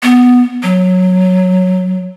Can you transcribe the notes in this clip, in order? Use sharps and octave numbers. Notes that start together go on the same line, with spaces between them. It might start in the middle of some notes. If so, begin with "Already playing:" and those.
B3
F#3